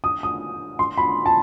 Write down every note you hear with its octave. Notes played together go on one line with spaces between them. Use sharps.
D#6
D#6
C6
B5
A5